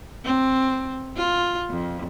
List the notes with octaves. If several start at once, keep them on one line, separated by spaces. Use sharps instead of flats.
C4
F4
F2